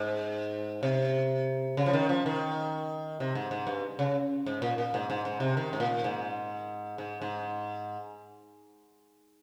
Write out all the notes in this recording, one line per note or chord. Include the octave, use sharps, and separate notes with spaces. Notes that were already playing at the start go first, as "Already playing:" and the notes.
Already playing: G#2
C3
C#3
F3
D#3
F3
D#3
C3
G#2
G#2
G2
C#3
G#2
A#2
A#2
G#2
G#2
G#2
C3
D#3
G#2
A#2
G#2
G#2
G#2